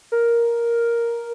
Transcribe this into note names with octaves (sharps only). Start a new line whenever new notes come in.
A#4